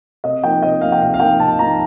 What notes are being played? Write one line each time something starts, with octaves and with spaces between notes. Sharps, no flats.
C3 D#5
F3 A#3 D#4 G5
C3 D#5
F3 A#3 D#4 F5
G5
C3 F5
F5
F3 A#3 D#4 G5
C3 A5
F3 A#3 D#4 A#5